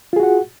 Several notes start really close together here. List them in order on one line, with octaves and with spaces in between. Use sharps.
F4 G#4 F#4 F#5